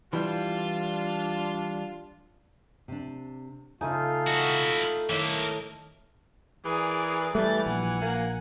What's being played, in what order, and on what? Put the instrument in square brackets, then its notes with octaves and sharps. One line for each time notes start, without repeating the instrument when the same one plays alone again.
[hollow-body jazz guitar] E3 G3 [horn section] D4 F4
[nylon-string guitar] C3 D4
[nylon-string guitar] C#3 A4 G#5 [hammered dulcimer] A3 D#4 [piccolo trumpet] F4
[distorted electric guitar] E4 F#4 [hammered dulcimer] D#5
[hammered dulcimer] A2 [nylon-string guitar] D#3 [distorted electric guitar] A#3 E5
[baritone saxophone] E3 [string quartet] G#4 A#4 D5
[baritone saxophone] E3 [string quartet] G3 A6 [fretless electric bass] A3
[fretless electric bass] A#1 [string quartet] F#5 G#5
[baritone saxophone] A#3